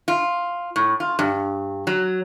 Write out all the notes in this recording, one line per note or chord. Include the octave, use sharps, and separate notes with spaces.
F4
A2
F4
G2
F#3